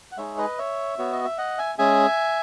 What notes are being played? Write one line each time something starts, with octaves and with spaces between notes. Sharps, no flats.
F#5
G#3 D#4 G#4 C#5 E5
B4 D#5
C#5 E5
B3 F#4 C#5
D#5
E5
D#5 F#5
E5 G#5
G#3 C#4 G#4 E5 G#5